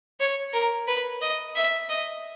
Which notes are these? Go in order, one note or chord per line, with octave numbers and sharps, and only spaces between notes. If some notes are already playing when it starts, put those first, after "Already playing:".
C#5
A#4
B4
D#5
E5
D#5